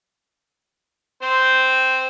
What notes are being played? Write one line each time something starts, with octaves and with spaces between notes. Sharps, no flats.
C4 C5